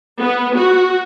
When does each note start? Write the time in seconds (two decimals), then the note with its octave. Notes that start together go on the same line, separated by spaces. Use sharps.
0.20 B3
0.55 F#4